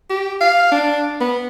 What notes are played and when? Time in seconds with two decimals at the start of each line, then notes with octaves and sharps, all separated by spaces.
0.10 G4
0.40 F5
0.72 D4
1.20 B3